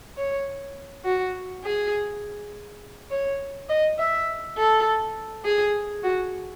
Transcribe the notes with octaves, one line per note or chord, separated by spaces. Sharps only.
C#5
F#4
G#4
C#5
D#5
E5
A4
G#4
F#4